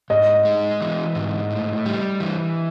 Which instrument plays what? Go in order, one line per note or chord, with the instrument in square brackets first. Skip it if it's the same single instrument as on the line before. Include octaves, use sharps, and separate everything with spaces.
[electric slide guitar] G#2 [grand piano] D#5
[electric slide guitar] G#3
E3
G#2
A2
G3
E3